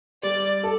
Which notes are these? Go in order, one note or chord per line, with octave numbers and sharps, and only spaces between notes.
G3 D5
A4